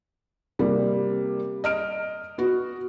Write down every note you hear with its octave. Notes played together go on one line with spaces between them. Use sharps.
C3 G3 A#3
D#5 F6 D7
B3 F#4